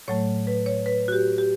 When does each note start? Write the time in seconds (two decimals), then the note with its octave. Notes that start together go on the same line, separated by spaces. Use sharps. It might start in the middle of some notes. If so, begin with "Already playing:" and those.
0.08 A2 F#3 A3 C#5
0.47 B4
0.66 C#5
0.86 B4
1.08 F#4
1.12 G4
1.38 G4